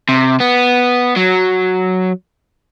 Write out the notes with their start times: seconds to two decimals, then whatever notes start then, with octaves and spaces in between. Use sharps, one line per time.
0.09 C3
0.40 B3
1.17 F#3